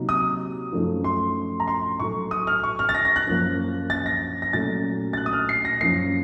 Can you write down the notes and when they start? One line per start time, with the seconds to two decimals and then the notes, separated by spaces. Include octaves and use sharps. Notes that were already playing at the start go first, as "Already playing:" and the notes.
Already playing: C3 F#3 A#3 D#4
0.09 D#6
0.72 F#2 F3 A3 D#4
1.04 C6
1.60 A#5
1.68 C6
2.00 A2 F#3 A3 C#6
2.31 D#6
2.47 F6
2.63 C#6
2.79 F6
2.89 A6
2.95 A#6
3.05 A#6
3.16 F#6
3.27 F#2 F3 A#3
3.90 A6
4.06 A#6
4.42 A#6
4.53 A#2 F#3 A3 C#4 A6
5.13 A6
5.17 F#6
5.26 D#6
5.33 F6
5.49 C7
5.65 A#6
5.81 F#2 F3 A#3 C7